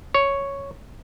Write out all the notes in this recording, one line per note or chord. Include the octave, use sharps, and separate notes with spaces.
C#5